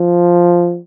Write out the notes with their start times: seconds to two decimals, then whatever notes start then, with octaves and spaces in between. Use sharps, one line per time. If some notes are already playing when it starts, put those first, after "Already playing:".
Already playing: F3